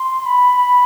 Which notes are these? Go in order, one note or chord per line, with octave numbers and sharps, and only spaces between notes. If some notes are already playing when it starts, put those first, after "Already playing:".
Already playing: C6
B5